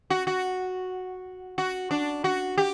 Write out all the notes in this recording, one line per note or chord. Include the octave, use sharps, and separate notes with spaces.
F#4
F#4
F#4
D4
F#4
G4